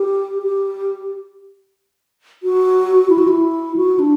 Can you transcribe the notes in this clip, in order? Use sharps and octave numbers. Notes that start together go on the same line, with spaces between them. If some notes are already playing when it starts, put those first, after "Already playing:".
Already playing: G4
G4
F#4
E4
F#4
E4
F#4
D4